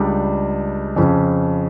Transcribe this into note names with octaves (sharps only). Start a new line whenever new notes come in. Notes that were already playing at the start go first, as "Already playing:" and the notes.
Already playing: C#2 C#3 G3 D4
F2 C#3 F3